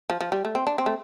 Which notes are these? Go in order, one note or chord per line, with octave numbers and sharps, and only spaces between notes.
F3
F3
G3
A3
C4
D4
C4
A3